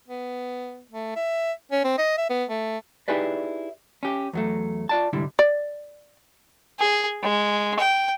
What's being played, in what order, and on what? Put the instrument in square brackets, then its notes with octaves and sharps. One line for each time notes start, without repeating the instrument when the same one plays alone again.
[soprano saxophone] B3
A3
E5
C#4
C4
D#5
E5
B3
A3
[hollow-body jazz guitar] D#4 E4 G4 G#4 B4 D5
C#4 G4
E2 F#3 A3
F4 D5 A5
C2 G#2 D3 G3 E4
[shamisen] D5
[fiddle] G#4
G#3
G5